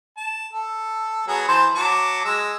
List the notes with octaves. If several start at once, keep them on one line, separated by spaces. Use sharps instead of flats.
A5
A4
F#3 B3 G#4
E3 C5 A5
F#3 A5 D6
G#3 E6